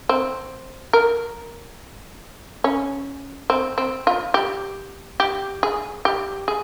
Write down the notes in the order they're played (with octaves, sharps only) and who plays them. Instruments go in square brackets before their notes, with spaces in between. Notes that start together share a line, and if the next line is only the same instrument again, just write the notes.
[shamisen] C4
A#4
C#4
C4
C4
F4
G4
G4
G#4
G4
G#4